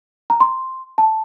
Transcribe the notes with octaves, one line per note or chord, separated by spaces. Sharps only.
A#5
C6
A5